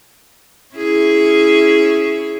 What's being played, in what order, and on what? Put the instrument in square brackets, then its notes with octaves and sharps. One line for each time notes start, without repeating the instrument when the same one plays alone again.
[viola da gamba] C#4 E4 G#4